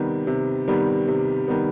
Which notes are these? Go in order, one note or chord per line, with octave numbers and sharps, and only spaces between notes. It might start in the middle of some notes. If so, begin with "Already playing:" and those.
Already playing: C3 D#3 G3 B3
C3
D#3 G3 B3
C3
D#3 G3 B3